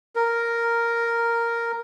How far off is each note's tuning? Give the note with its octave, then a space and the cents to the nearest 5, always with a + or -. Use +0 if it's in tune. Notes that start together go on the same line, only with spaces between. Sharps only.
A#4 -5